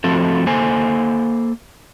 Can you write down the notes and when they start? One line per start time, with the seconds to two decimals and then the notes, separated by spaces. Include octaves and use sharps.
0.04 F3 A3 C4 F#4 A4
0.47 A#3 A4 C5 G#5